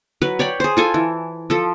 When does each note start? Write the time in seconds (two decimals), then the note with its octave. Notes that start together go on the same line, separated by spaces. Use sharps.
0.22 F#3 B4
0.39 C#5 D5 G5 B5
0.60 G#4 C5
0.77 F4 A4 G#5
0.94 E3
1.50 F3 A4